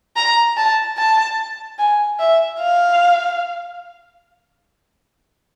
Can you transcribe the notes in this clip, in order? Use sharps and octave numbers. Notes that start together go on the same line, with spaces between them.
A#5
A5
A5
G#5
E5
F5